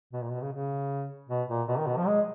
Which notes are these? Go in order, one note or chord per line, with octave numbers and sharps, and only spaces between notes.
B2
A#2
B2
C#3
C#3
B2
A#2
B2
D#3
B2
F3
G#3